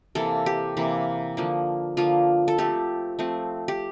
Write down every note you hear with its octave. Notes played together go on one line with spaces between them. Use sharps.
C3 E3 A#3 A4
G4
C3 E3 A#3
D3 F3 A#3
D3 F3 A#3 F4
A4
F3 A3 C4 G4
F3 A3 C4
G4